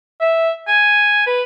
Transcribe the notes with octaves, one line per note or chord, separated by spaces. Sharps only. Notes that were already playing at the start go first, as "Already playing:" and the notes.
E5
G#5
B4